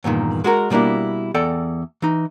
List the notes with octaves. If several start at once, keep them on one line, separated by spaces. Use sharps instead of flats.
E2 G2 A#2 D#3
G#3 F#4 A#4
B2 G3 A#3 D4 E4
E2 A4 D5 G5
E3 D#4